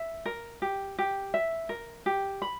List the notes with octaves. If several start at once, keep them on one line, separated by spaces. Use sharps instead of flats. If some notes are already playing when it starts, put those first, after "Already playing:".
Already playing: E5
A#4
G4
G4
E5
A#4
G4
B5